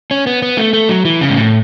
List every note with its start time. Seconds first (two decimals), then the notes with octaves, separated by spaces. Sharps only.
0.11 C#4
0.27 B3
0.42 B3
0.58 A3
0.73 A3
0.89 F#3
1.05 E3
1.21 C#3
1.29 G#2
1.37 A2